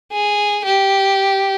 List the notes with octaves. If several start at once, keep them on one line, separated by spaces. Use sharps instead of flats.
G#4
G4